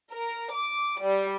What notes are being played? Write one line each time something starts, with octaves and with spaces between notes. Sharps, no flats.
A#4
D6
G3